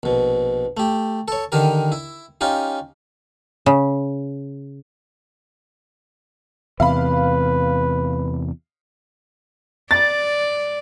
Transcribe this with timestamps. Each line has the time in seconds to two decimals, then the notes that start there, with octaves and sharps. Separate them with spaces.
0.03 A#1 B2
0.77 A3 G4
1.28 A4 C#5
1.52 D3 D#3 G4 A#4
1.92 E4
2.41 C#4 D#4 F4 G4
3.66 C#3
6.80 E2 C3 B4 F5 B5
9.91 D5 A6